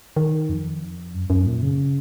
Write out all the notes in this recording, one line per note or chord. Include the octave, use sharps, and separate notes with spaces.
D#3
F2
F#2
F#2
A#2
C#3